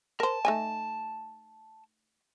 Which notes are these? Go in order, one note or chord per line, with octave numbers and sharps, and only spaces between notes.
A#4 C5 A5
A3 D#4 G#5